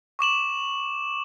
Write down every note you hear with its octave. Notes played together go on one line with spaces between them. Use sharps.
C#6 D6 E7 F#7